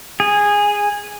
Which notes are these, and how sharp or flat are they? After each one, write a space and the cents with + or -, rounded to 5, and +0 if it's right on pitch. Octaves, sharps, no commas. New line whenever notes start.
G#4 -10